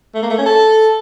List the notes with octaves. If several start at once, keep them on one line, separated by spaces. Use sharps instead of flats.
A3
A#3
A3
C#4
A4